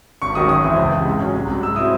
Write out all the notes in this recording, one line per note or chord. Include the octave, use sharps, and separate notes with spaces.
G#1 C#6
G#2 D#3 F#3 C#4 D#6
F#2 D#6
E3 C4 E4
C#2
C3 E3
G#2
F#3 C#4
C2
C3 F#3
G#2 E6
F#3 C4 E4 D#6